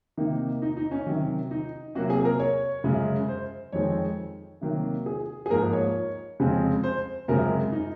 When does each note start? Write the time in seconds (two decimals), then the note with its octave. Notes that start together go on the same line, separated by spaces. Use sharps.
0.17 C3 D#3 A#3 D#4
0.62 D#4
0.77 D#4
0.91 C#4
1.06 C3 D#3 F#3
1.51 D#4
1.95 C3 F#3 A#3 F#4
2.10 G#4
2.25 A#4
2.40 C#5
2.84 F#2 C#3 G#3
3.28 C5
3.72 F2 D#3 G#3 C4 C#5
4.61 C3 D#3 F#3 A#3
5.06 G#4
5.46 G#4
5.50 G#2 F3 A#3 A#4
5.73 C#5
6.40 F2 C#3 G#3 C4
6.84 C5
7.28 F#2 C#3 G#3 C4 A#4
7.72 D#4